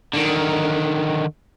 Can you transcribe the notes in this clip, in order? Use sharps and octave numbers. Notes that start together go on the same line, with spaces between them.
D3 D#3